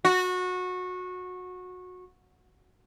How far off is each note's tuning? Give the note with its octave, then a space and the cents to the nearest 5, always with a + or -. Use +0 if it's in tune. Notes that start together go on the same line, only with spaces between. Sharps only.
F#4 -20